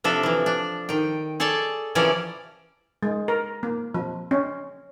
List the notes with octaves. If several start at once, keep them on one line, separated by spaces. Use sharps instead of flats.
C3 F3 D4 A4 E5
E3 F3
D4
D#3 G5
G#4 A4 C#5 D5 A5
C3 E3 F3 C#4 A#4 D5
G#3
A#4
A#3
F3
C#4